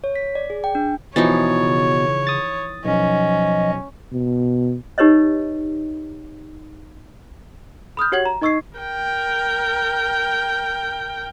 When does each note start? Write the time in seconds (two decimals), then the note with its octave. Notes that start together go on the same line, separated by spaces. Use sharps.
0.04 C#5
0.16 B6
0.35 D5
0.50 G#4
0.64 G5
0.75 D4
1.16 B2 E3 F3 D#4 C#5 A6
1.57 C#3
2.27 D#6 A6
2.85 B1 F3 C#4 D#5
4.12 B2
4.98 D#4 G4 B4 C#5 D#5
7.97 B5 D#6 F6 G6
8.12 F#4 G4 C#5 F#5 G#6 F#7
8.25 A#5
8.41 D#4 D#5 C#6 E6 G#6 C7
8.78 A#4 G5